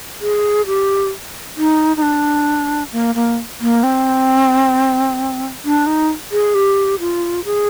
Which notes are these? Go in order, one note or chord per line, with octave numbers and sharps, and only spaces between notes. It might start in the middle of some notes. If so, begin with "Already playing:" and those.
G#4
G4
D#4
D#4
D4
A#3
A#3
A#3
C4
D4
D#4
G#4
G4
F4
G#4